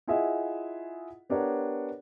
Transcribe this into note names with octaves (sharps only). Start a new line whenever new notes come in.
E4 F4 G#4 D#5 E5 F#5
B3 D4 G4 A#4 C#5 F#5